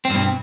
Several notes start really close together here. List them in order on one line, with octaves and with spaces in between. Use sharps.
C4 G2 B2